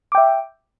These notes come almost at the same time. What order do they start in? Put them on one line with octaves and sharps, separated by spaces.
D6 G5 E5